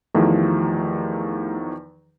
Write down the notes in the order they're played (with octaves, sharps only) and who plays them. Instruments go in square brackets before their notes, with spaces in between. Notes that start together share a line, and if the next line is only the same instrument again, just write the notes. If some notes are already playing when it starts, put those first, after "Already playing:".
[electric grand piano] E2 D#3 F3 [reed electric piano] A3 E4 G4